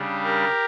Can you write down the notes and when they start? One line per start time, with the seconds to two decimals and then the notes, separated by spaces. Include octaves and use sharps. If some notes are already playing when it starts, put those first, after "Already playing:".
Already playing: C#3 G3 D4
0.23 G4 A#4